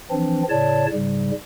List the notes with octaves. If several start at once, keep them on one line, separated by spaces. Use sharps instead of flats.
E3 F3 C4 D4
A2 C#3 C#5 D5 A5
G#2 C#3 G3